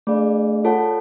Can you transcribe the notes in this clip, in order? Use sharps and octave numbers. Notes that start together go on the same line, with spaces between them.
A3 D4 G#4 D5 F5
F4 A4 C#5 F#5 A5